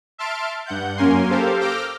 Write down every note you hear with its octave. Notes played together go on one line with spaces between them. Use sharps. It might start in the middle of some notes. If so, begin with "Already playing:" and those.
E5 A5 C6 F6 D7
G2 F#5 G6
F#2 A#3 C#4 A#4 G#5 C6
G4 A4 A#4 C5 F5
D6 E6 F6 G6 A#6 D7